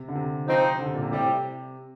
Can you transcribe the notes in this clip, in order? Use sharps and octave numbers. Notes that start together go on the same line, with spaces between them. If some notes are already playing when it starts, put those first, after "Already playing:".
Already playing: C3
D3
C3
F3 C4 D#4
D3
C3
A#2
C3
A2 G3 C4 G4